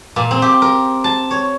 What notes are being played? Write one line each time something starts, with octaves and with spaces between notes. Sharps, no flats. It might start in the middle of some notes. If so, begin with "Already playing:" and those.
A#2
C4
G4
A#4
A5
C#5